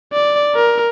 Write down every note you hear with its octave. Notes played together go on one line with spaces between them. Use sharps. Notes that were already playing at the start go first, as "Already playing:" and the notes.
D5
A#4